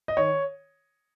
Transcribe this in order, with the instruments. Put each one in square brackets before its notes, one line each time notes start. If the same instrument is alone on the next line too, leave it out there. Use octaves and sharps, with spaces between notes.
[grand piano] D#5
D#3 C#5